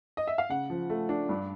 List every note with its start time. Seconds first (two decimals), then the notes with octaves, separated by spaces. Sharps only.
0.17 D#5
0.27 E5
0.38 F5
0.49 C#3 F#5
0.70 F3
0.90 A3
1.09 D4
1.29 G2